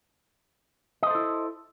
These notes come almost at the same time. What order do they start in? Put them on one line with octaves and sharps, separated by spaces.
D#5 C5 A4 E4